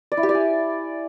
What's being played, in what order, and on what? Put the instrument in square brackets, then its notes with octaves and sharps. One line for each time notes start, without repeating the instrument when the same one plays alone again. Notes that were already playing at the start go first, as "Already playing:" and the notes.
[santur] D5
E4
G4
D5
G#5